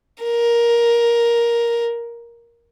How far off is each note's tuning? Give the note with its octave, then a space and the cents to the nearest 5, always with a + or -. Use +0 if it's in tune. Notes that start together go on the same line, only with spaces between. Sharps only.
A#4 +10